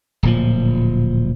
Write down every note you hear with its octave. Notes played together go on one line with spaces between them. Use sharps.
D1 A#2 F3